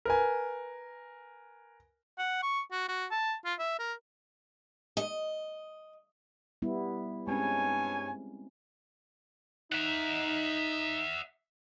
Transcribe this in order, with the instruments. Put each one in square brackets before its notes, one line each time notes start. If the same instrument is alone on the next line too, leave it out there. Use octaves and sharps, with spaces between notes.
[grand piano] A#4 B4 G#5
[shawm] F#5
C#6
F#4
F#4
A5
F4
E5
A#4
[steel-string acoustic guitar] D#5
[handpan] G3 B3 E4
[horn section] G2 C#5 G#5 [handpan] G#3 C4 C#4
[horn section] D#4 [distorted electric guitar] E5 F#5